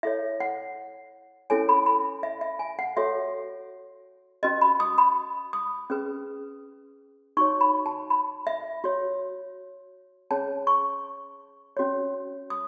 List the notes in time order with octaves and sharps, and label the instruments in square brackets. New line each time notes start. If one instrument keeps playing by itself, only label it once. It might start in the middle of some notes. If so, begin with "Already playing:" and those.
[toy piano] E4 A4 C#5 E5
F#5
C#4 E4 A4 C#5 G#5
B5
B5
E5
E5
G#5
F#5
F#4 A4 C#5 E5
C#4 F#4 B4 D#5
B5
D#6
B5
D#6
C#4 G#4 B4
D#4 F#4 C#5 C#6
B5
A5
B5
E5
F#4 C#5
C#4 G#4 C#5 A5
C#6
C#4 F#4 C#5
D#6